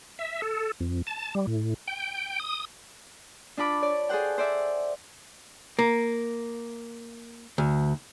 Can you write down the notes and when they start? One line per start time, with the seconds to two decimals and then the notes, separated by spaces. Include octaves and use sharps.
0.19 E5
0.42 A4
0.80 F2
1.07 A5
1.35 G3
1.47 A2
1.87 G5
2.40 D#6
3.57 D4 F4 A5 B5 D6
3.82 C#5 D5
4.09 G#4 A4 C5 F#5 G5
4.38 C5 D5 E5
5.79 A#3
7.58 D2